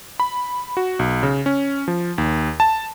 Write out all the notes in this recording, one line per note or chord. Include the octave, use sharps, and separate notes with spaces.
B5
F#4
B1
C#3
C#4
F3
D#2
A5